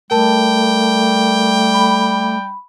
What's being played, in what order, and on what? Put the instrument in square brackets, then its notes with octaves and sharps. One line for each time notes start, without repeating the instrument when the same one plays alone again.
[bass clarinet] G3 [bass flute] A3 [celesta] A#4 A5 [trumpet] G5
[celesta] B5